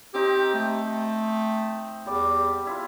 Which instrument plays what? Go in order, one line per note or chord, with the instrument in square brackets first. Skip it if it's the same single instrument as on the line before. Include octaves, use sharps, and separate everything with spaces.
[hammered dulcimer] C4 D#4 [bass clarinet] G4
[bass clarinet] A3
[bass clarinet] E2 [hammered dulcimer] G3 D5 D6
[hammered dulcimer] E4 F4